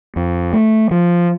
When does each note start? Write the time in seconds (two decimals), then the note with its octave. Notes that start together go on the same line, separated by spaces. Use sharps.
0.16 F2
0.53 A3
0.91 F3